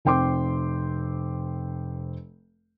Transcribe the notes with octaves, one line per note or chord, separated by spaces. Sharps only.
F1 C4 G5 C6 D6